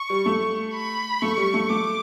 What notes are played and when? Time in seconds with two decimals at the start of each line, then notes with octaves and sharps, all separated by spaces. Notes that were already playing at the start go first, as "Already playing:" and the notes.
Already playing: C#6
0.10 G3
0.26 A3
0.74 B5
1.22 A3 C#6
1.37 G3
1.54 A3
1.69 A3 D6